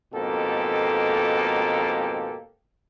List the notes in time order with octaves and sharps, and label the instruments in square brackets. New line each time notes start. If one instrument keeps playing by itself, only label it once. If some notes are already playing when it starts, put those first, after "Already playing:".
[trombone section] F2 G#2 B2 A#3 G4 A4